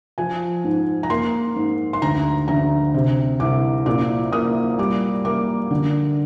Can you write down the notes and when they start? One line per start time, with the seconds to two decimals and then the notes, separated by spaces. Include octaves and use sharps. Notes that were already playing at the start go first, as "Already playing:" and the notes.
0.18 F3 G#5
0.64 G#2
1.03 A#5
1.10 A#3 C6
1.56 G#2
1.93 C6
2.02 D2 A#5
2.48 D2 A#5
2.94 C3
3.40 C2 D6
3.86 A#2 D6
4.32 A#3 D#6
4.78 G3 D6
5.25 A#3 D6
5.71 D3